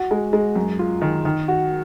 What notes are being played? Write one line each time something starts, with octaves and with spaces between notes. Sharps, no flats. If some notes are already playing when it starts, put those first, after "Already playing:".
Already playing: F#4
G#3
G#3
F#2
F4
D#3
D#3
F#4